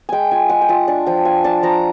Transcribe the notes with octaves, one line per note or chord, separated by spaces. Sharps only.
G#3 G5 G#5
F4 G#5
G#3 F#5
G5
F4 F#5
D4 G#5
F3 G5
F4 G#5
D4 A5
F3 A#5